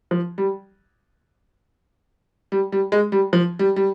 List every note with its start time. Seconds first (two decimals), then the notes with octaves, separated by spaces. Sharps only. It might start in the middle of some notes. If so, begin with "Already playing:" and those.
0.11 F3
0.38 G3
2.52 G3
2.72 G3
2.92 G#3
3.12 G3
3.33 F3
3.59 G3
3.76 G3